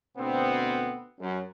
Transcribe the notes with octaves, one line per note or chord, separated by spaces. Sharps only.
D2 B2 B3 C4
F#2